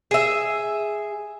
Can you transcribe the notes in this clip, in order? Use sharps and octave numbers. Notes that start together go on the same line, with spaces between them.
G#4 E5